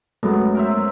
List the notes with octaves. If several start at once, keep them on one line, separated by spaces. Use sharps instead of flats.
F#2 F#3 G#3 A3 B3
A#4 C5 E5